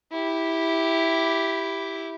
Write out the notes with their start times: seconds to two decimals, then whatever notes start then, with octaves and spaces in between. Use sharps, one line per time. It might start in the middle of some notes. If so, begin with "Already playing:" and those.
0.12 E4 G4